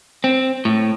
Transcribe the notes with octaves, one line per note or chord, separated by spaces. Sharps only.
C4
A2